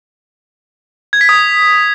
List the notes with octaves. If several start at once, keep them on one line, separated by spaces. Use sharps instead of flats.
G#6
B6
D#6